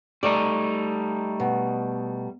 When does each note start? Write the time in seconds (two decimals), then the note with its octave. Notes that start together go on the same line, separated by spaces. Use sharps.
0.23 G3 A3 D#4 D5
1.40 B2